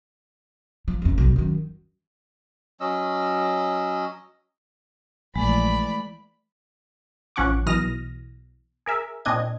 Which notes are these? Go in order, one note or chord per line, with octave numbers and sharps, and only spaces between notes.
F3
F#1 F2
B1
F#2 D#3
F#3 C#4 D#5 E6
A#1 E3 G#3 A3 D5 B5
A1 F3 C#4 F#5 C#6 D6
B1 B2 E3 D#6 F6 A#6
G#4 A#4 E5
A#2 C4 D4 D#5 G#6